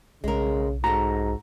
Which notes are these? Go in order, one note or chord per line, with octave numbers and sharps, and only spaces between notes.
B1 C#3 G#3 A#4
G#2 F#4 A4 A#5